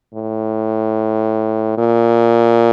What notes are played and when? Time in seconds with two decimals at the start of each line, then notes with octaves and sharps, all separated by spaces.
0.14 A2
1.78 A#2